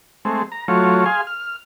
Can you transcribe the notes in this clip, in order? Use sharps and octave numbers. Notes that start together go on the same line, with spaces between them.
G#3 A3 C4
A#5
F#3 A3 F4 C#5
G#4 F5 G#5 C6
F6